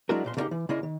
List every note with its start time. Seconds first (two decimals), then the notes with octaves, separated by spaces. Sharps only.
0.09 F#3 G#3 D4 E4 F#4 A#4
0.24 B1 A#2 C6
0.37 C#3 A3 A#3 C#4 D#4 G4
0.51 E3
0.69 C#3 A#3 E4 D5 D#5 C6
0.83 D#3